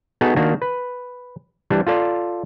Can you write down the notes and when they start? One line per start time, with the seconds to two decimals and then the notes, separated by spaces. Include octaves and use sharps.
0.21 B3 D#4 F#4 G#4 A4
0.36 D#3 A#3 D4 F#4
0.62 B4
1.70 E3 G3 D4
1.87 F4 A4 D5